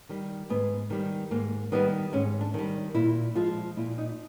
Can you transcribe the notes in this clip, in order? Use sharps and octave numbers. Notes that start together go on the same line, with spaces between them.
D#3 G3
G#2 B3
D#3 G3
G#2 A#3
D#3 G3 B3
G#2 C#4
D4
D#3 G3
A#2 E4
F3 G#3 F4
A#2 E4
D#4